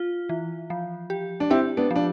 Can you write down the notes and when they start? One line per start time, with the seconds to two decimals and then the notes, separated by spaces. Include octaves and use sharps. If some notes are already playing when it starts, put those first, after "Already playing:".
Already playing: F4
0.29 E3
0.70 F3
1.10 G4
1.40 D4
1.50 C4 E4 G4
1.77 B3 D4
1.91 F3 D4